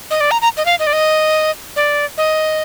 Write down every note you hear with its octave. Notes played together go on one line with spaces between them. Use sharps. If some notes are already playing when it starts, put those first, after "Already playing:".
D#5
D5
A#5
A#5
D#5
F5
D#5
D5
D#5
D5
D#5